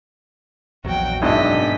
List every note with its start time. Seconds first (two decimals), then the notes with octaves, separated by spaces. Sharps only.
0.85 A#1 E2 F#3 F#4 G5
1.22 G#1 F#2 B2 D4 D#5 E5 B6